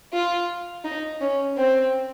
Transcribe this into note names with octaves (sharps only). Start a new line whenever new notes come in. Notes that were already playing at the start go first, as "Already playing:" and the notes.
F4
D#4
C#4
C4